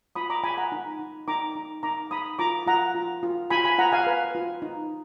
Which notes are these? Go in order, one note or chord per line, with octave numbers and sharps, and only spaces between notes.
F4 B5 D#6
A#5 D6
F4 G#5 B5
F#5 A#5
D#4
D#4
D#4 A#5 D6
D#4
D#4 A#5 D6
D#4 B5 D#6
F4 A#5 D6
F4 F#5 A#5
F4
F4
F4 G#5 B5
G#5 B5
F4 F#5 A#5
F5 G#5
B4
F4
D#4